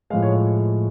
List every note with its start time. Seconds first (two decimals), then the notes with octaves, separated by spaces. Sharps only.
0.10 A2 F3 G#3 F5
0.22 C#5
0.35 C#5